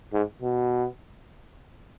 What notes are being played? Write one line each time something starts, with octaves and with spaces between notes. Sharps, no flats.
G#2
B2